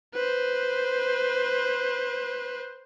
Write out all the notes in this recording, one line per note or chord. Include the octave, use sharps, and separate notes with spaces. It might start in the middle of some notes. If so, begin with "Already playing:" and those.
B4 C5